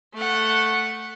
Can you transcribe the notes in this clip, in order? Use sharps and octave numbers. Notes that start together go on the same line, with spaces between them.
A3 F#5